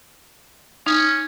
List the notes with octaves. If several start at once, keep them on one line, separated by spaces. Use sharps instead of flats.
C#4 D#4